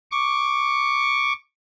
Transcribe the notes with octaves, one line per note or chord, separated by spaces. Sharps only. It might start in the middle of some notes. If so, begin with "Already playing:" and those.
C#6 D6